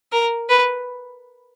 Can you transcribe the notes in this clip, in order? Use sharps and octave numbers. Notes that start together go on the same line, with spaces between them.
A#4
B4